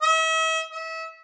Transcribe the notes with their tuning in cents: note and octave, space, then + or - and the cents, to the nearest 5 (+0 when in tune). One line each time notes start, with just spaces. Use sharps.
E5 -40
E5 -30